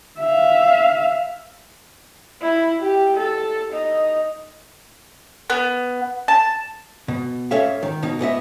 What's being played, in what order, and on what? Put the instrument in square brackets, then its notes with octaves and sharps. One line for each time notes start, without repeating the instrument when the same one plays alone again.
[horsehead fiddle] E5 F5
[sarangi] E4
G4
A4
D#4
[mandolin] B3
A5
[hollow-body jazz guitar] B2
G#2 C#4 A4 C#5 E5 F5
D#3
B2 D#4
G#2 B3 D#5 E5